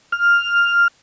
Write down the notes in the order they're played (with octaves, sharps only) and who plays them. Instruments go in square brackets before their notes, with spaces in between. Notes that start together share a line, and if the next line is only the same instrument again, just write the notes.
[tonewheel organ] F6